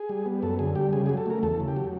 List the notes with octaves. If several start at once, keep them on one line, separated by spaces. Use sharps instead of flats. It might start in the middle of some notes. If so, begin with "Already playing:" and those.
Already playing: G#4
G3
B3
F#2 A4
D3 G#4
G3 G4
C#3 G#4
F#3 G#4
A4
A3 A#4
E2 A4
C#3
G4
F#3